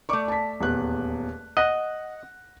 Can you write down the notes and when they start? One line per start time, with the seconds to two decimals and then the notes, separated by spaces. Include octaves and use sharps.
0.09 A3 D5 C#6 D6
0.28 A5 B6
0.60 D#1 E2 F#6
1.57 D#5 F#5 F#6 A#6